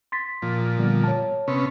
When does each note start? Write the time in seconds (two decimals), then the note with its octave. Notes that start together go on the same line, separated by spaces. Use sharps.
0.12 C6 A6 B6
0.42 A#2 F3
0.78 D3 G3 B3
1.04 C#5 A5
1.48 C3 B3 C#4